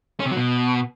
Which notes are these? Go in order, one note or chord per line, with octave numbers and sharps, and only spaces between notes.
C#4
C3
F#3
B2